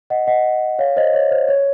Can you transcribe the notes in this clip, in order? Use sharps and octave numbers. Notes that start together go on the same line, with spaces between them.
D#5 F#5
D#5 F#5
C#5 F5
C5 D#5
C#5
C5
C#5